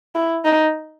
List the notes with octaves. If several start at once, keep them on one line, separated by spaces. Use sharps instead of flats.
E4
D#4